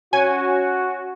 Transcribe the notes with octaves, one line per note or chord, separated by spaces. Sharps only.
C#4 F#4 G#5